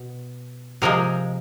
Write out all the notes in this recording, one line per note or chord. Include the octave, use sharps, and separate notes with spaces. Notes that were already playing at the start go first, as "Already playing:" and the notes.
Already playing: B2
C3 F3 G#3 A#4